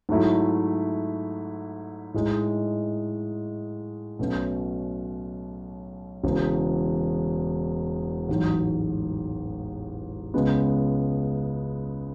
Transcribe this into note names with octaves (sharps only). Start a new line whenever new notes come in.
G#2 F#3 A3 E4
A2 G#3 D#4
B1 B2 A3 C#4
E1 E2 C#3
A1 G#2 F#3
C#2 C#3 G#3 B3